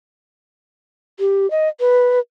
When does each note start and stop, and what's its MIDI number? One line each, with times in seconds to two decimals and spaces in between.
1.19 1.50 67
1.51 1.68 75
1.80 2.19 71